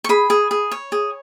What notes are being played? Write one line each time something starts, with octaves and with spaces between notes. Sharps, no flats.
C#6
G#4 B5
G#4
G#4
C#5
G#4